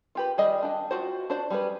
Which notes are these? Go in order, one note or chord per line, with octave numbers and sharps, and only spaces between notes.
F4 G4 B4
D#3 G3 G#4 D5 D#5
D4 G5
F4 F#4 C5
D4 F#4 C5 D5
G3 G#4 B4